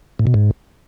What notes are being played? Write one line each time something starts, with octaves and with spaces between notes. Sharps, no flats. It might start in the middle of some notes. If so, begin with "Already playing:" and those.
A2
B2
G#2